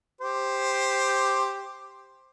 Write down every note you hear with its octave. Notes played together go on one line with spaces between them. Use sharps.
G4 C5